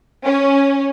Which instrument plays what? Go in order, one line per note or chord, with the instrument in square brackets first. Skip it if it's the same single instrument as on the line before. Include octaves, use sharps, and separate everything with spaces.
[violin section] C#4